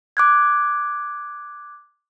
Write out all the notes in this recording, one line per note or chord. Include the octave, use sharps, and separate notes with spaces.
D6 F#6 G#6